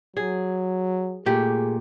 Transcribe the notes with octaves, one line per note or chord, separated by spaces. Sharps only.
F#3 G#4
A#2 A3 G4 G#4